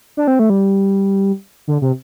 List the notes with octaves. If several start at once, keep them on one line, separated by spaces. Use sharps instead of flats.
D4
C4
A3
G3
D3
C3